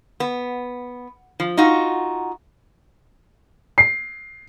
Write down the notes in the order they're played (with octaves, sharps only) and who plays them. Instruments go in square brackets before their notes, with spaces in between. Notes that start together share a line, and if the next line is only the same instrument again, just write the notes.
[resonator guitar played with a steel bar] B3
F3
D#4 F4 F#4
[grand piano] C7